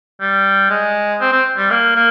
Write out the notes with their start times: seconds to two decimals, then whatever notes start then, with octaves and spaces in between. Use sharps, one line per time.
0.21 G3
0.70 G#3
1.20 C4
1.32 C4
1.57 G3
1.71 A#3
1.95 A#3